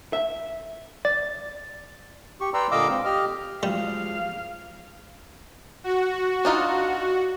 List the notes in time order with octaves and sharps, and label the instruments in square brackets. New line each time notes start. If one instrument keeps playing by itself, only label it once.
[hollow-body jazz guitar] E5
[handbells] D5 [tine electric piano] A6
[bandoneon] G4 C#6
B4 D5 G5 A#5 C6 E6
A#2 D3 D#5 F5 D6 E6
G#3 C4
G4 D#5 F6
[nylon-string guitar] F3 G#3 F#4 [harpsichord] G3 [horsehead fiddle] F5
[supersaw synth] F#4
[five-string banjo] D4 D#4 F4